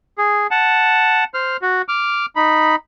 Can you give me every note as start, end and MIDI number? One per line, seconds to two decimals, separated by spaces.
0.18 0.47 68
0.51 1.24 78
0.51 1.24 81
1.34 1.57 72
1.34 1.57 89
1.62 1.82 66
1.88 2.26 86
1.88 2.26 89
2.36 2.76 63
2.36 2.76 83